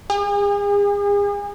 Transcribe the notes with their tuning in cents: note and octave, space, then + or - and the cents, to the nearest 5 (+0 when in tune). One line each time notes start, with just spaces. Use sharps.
G#4 -40